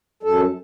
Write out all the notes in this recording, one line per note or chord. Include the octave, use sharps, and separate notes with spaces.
F#2 A4